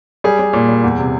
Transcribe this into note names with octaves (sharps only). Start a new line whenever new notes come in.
G3 G#4
G3
A#2
G3
E2
C3